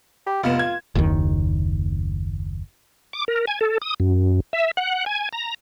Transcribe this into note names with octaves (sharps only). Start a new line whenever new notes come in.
G4
F1 B3 F4 E7
G#6
F#1 D#2 D#3
D6
A#4
G#5
A4
D#6
F#2
E5
F#5
G#5
A#5